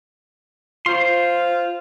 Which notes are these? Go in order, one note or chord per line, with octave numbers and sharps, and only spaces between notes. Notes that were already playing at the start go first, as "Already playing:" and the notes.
F4 C5 C6